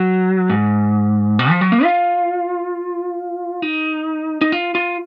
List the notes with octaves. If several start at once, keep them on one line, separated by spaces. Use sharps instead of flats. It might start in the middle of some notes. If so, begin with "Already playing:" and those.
Already playing: F#3
G#2
B2
F3
F#3
A#3
F4
D#4
D#4
F4
F4